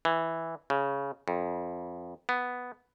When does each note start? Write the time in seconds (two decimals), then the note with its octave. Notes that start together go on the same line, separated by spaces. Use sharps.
0.05 E3
0.70 C#3
1.28 F2
2.29 B3